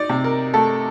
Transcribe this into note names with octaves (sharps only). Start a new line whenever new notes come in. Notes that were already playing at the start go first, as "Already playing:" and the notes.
Already playing: D#4 D5
C3
A#4
A3 A4